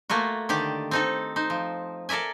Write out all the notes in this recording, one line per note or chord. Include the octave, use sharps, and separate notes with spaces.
A3 A#3 F4 F#4
D3 D#3 G4 D5
C4 D#4 A4
D#4 C5
F3
A4 A#4 D5 E5 G#5